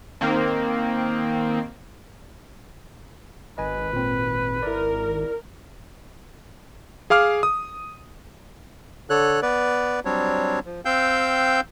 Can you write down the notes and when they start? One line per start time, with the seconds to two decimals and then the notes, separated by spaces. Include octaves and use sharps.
0.21 D#3 A#3 C4
3.58 G#1 B4 D#5 G#5
3.93 A#2 C4
4.63 E4 A#4 D5
7.10 G#4 F5 D6 F6
7.43 D#6
9.10 D3 A4 C#5 F#6
9.42 B3 B4 D5
10.05 F#3 G3 C4 D4 C#5
10.65 F3
10.85 C4 F5 G5 E6 G6